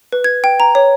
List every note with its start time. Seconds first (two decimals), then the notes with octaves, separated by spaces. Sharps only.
0.12 B4
0.24 G#6
0.44 G5
0.60 A#5
0.75 C#5